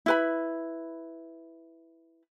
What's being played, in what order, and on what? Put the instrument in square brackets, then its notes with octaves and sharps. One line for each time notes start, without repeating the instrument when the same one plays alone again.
[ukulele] E4 B4 B5